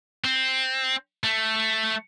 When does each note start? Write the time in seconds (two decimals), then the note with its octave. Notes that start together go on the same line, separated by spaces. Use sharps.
0.25 C4
1.24 A3